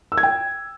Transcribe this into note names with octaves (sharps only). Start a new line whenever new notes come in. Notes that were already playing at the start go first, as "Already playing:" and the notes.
E6
G#6
G5